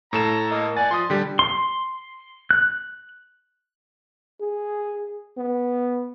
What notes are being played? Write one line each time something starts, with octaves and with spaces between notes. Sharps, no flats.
A2 A4 A#5 E7
A#3 D#5
D5 F#5 G#5 A6
F3 C6 D#6
D3 G3 G4
C6
F#6
G#4
B3